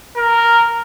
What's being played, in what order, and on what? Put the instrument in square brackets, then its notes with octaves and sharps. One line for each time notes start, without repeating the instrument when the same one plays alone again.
[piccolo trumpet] A#4